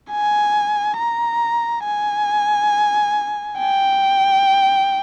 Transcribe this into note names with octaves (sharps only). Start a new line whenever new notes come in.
G#5
A#5
G#5
G5